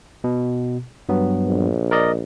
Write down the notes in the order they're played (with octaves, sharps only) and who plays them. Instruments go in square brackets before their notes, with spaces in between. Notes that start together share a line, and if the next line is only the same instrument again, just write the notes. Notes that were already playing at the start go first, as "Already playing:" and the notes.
[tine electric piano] B2
G2 F#3 B3
[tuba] A#1
[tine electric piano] A#4 D5 D#5